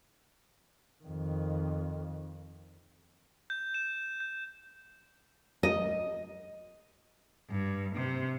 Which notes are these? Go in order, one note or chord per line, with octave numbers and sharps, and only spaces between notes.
F2 D#3
G6
E7
G6
D#5
G2
C3